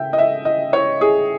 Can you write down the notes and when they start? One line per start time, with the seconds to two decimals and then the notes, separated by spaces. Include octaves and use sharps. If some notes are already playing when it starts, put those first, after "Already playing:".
Already playing: C#3 E5 G5
0.13 D#5
0.18 E5
0.45 D#5
0.73 C#5
1.01 G#4